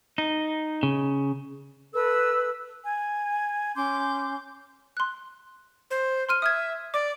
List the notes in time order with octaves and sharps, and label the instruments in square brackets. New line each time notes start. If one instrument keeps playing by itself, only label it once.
[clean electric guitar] D#4
C#3
[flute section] A4 B4 E6
G#5
C#4 C6 D6 G6
[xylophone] C6 F#6
[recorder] C5
[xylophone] C6 F6 D#7
[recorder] E5 [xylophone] D#6 F6 G#6
[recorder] D5 [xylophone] D6